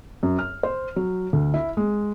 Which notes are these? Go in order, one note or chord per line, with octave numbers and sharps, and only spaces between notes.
F#2
F6
C5
F#3
D2
E4
G#3